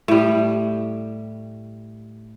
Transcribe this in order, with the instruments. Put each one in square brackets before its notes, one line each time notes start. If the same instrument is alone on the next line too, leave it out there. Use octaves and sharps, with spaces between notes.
[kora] A2 G3